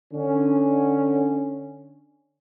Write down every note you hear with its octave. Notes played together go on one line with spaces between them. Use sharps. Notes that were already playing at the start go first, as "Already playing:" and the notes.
D3 C#4